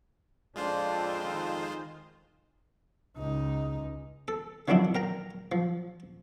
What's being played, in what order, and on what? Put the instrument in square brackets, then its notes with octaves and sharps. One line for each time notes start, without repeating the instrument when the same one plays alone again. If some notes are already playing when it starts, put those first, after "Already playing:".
[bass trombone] F2 [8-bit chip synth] G#3 F4 C5 [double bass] D4
[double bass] D#3
C#2 D#4
[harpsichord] A4
D#3 F3 F#3 C4 D4 E4
A#4 G5 A#5
F3